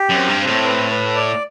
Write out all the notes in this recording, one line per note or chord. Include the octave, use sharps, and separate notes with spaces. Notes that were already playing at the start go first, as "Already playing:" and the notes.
Already playing: G4
F#2
C4
G2
C4
A2
B4
B4
D5